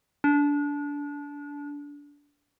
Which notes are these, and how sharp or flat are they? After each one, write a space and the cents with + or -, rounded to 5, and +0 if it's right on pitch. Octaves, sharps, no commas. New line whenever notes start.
D4 -25